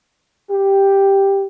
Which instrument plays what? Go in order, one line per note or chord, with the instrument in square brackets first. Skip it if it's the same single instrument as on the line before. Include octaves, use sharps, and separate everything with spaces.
[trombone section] G4